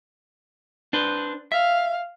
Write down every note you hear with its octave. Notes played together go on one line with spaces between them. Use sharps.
D4 B4 C5
E5 F5